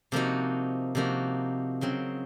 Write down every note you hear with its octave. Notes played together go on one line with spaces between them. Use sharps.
C3 F3 A#3 D#4 F#4
C3 F3 A#3 D#4 F#4
C#3 F#3 C4